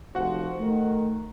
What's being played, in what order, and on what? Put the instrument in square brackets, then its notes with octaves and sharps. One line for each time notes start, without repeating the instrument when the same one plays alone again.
[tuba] F1 [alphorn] F3 [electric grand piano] F#4 F#5
[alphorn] D#3 [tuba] A3